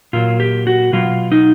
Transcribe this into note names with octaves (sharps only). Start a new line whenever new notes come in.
A#2 F#3 F4
G4
F#4
B2 F#3 F4
D#4